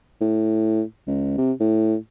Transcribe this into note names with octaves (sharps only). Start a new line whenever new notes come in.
A2
C#2
C3
A2